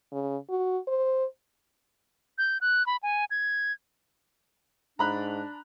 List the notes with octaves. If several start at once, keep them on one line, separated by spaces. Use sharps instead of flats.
C#3
F#4
C5
G6
F#6
B5
G#5
G#6
G#2 D4 A#5 B5 F#6